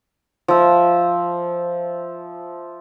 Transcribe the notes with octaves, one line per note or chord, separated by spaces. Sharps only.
F3 E5